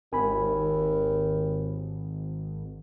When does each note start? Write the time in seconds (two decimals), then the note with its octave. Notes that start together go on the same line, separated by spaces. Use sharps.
0.13 G#1 D#2 G#5 B5